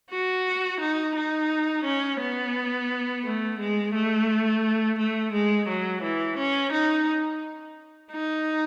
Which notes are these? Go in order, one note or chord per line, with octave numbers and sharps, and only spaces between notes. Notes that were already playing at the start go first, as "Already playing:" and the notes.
F#4
D#4
D#4
C#4
B3
A3
G#3
A3
A3
G#3
F#3
E3
C#4
D#4
D#4